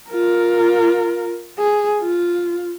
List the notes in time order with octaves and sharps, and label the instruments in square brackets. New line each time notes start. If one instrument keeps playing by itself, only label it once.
[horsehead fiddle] F4 A#4
G#4
F4